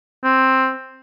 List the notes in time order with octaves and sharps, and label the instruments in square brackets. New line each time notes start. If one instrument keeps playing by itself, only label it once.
[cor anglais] C4